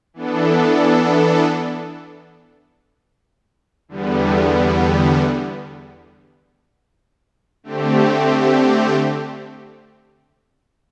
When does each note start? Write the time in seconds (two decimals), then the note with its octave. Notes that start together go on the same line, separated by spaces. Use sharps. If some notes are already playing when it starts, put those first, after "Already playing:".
0.14 E3 B3 D4 A4
3.88 E2 D3 G3 B3
7.63 D3 A3 C4 G4